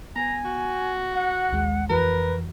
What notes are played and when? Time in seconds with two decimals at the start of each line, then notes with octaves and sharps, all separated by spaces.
0.16 B3 G#5 A#5
0.45 F#4
1.14 F#5
1.51 A#1 D#2 G#3
1.90 F2 E3 F#4 A#4 B4